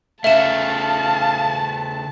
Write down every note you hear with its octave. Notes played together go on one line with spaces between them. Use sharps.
C#3 A3 E5 F5 A5 E7